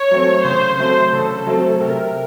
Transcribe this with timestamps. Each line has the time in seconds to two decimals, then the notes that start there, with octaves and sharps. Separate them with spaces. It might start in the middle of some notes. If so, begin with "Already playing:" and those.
Already playing: C#5
0.11 F#3 A3 C4
0.44 C#3 C5
0.78 F#3 A3 C4 C5
1.13 C#3 A4
1.46 F#3 A3 C4
1.81 C3 A#4